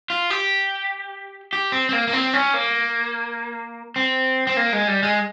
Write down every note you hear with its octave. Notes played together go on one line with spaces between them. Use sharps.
F4
G4
G4
C4
C4
A#3
A#3
C4
C#4
A#3
C4
C4
A#3
G#3
G3
G#3